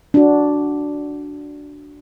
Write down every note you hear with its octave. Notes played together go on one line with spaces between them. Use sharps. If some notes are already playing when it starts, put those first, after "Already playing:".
D4 F#4